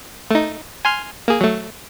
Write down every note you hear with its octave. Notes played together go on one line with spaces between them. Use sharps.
A3 D#4
G#5 C6 F6
A#3 G#4
F#3 A3